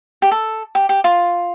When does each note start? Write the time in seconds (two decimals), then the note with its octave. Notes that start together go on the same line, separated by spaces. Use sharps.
0.22 G4
0.31 A4
0.75 G4
0.89 G4
1.04 F4